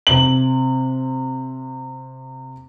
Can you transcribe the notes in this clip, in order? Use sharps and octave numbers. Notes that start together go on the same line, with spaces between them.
C3 F#7